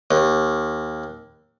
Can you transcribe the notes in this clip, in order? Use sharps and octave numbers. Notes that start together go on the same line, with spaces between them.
D#2